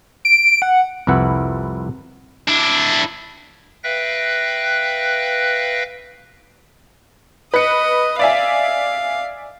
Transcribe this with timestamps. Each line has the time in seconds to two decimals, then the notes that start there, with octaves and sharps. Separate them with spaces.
0.25 D7
0.62 F#5
1.07 C2 F2 E4 B4 F#5
2.48 D4 E4
3.84 B4 E5 F5 G5 F#6 A#6
7.54 B4 D#5 C#7
8.19 D5 E5 F5 G#5